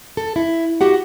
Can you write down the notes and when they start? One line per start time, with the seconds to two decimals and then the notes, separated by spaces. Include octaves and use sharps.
0.17 A4
0.36 E4
0.81 F#4 G4 F#5